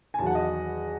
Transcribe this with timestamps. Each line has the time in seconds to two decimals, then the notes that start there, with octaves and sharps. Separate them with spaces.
0.14 G#5
0.19 E2 D#3 F#3 A5
0.26 F#5
0.35 D#5